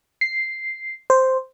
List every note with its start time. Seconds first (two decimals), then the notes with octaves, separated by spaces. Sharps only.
0.21 C7
1.10 C5